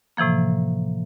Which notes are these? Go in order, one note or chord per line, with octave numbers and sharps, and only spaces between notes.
A2 C3 E3 F3 A#3